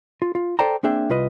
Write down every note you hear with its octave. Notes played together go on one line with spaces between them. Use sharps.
F4
F4
A4 C5 D5 G5 A5 A#5
A#3 C4 D4 G#4 E5 G5
C2 F4 B4 D#5